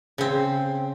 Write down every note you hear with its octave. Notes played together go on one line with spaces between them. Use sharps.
C#3 C4